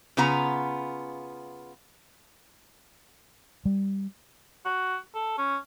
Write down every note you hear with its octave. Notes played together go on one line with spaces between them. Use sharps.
C#3 B3 F4 A#5
G3
F#4
A4
C#4